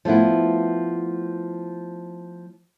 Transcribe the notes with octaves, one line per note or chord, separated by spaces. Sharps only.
F3 A3 B3 E4